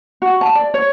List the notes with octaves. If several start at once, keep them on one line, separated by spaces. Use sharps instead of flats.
F#4
A5
D5
C#5